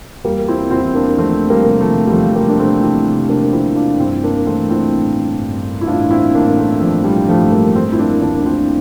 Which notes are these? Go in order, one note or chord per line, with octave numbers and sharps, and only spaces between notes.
E2 G3 A#3
C4 E4
E2 C4 E4
A#3 D4
F3 A3 C4
G3 A#3
C3 G3
F3 A3
G3
E2 F3 A3
G3 A#3
D4
C3 A3 C4
C4 E4
C3
A#3 D4
F3 C4 E4
D4 F4
G2 C4 E4
A#3 D4
E3 A3 C4
C4 E4
A1
G2
E4
A1 D4 F4
C4 E4
A1 A#3 D4
A3 C4
A1 F3
G3
G2 F3 A3
G3 A#3
F3 A3 C4
E4
A#3 D4
D2 A#3 D4
C4 E4
D4